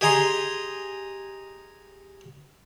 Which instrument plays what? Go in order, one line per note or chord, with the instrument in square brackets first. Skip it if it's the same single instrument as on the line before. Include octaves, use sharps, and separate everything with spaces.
[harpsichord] G4 G#4 D#5 G#5 A#5 C6